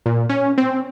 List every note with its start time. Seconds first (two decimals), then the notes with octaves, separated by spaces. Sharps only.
0.06 A#2
0.29 C#4
0.58 C4